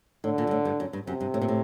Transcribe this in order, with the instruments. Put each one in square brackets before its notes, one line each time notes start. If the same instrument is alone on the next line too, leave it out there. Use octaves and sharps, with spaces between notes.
[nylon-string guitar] A2 [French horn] D3
[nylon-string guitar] A#2
G2
A2
G2
F#2
G2
[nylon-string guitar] F#2 [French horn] C3
[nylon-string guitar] G2
A2
A#2
A2